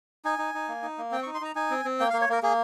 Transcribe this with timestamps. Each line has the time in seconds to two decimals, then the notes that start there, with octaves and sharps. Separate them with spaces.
0.25 D#4 G#5
0.39 D#4
0.54 D#4
0.68 A#3
0.83 D#4
0.98 A#3
1.11 C4 G5
1.23 C#6
1.27 D#4
1.34 C6
1.41 D#4 A#5
1.55 D#4 G#5
1.70 C4
1.85 C4
2.00 A#3 G5
2.10 F5
2.13 A#3
2.21 C#5
2.29 A#3 A#4
2.43 A#3 G#4